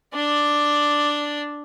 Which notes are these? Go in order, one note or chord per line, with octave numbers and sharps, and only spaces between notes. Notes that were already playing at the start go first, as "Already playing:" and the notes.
D4 D5